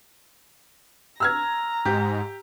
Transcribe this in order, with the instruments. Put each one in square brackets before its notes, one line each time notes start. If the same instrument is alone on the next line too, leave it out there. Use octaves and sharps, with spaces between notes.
[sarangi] A#5 [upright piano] E6 F6 G#6
[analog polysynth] G#2 [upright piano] G4